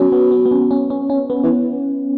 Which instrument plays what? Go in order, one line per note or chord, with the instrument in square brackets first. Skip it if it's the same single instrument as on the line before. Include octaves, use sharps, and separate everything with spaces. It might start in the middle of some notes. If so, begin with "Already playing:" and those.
Already playing: [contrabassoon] F#3 [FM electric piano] B3 C#4
[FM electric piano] B3
B3
B3
C#4
C#4
C#4
C#4
B3
[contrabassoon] E3